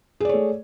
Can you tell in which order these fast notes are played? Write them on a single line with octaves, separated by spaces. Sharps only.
G#4 D5 C#5 A3